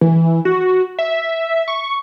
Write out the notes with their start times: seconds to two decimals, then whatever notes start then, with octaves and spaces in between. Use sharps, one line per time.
0.01 E3
0.45 F#4
0.99 E5
1.68 C#6